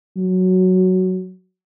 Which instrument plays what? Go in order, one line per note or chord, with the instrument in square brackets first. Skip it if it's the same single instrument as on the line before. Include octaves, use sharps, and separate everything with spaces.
[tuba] F#3